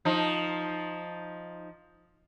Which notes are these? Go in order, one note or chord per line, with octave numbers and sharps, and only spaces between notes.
F3 D#4